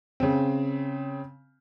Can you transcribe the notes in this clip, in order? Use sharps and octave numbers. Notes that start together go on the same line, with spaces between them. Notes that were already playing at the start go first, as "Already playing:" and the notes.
C#3 C4